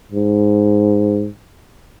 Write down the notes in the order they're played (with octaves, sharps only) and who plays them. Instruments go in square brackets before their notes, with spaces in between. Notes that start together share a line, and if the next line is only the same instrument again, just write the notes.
[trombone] G#2